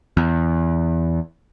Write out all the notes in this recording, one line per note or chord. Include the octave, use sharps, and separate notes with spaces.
E2